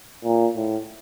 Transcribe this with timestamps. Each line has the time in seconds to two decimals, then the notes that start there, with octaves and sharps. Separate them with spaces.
0.24 A#2
0.56 A2